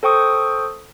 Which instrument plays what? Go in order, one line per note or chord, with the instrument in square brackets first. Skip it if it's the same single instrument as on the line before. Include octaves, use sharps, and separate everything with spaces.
[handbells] A4 C5 G5 C#6 D#6